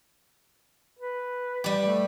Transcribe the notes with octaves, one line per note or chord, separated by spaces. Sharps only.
B4
G3 G4
A3